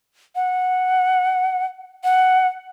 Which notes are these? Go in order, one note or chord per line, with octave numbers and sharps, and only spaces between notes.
F#5
F#5